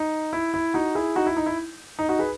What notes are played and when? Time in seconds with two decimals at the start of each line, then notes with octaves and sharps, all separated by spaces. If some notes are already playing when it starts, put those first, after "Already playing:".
Already playing: D#4
0.33 E4
0.54 E4
0.74 D#4 F#4
0.95 E4 G#4
1.16 D#4 F#4
1.26 E4
1.37 D#4
1.46 E4
1.99 D#4
2.09 D#4 F#4
2.19 G#4 B4